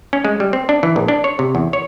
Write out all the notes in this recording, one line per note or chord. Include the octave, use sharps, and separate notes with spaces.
C#4
G#3
G3
C4
D4
E3
A#1
D4
C#5
C3
E2
C#5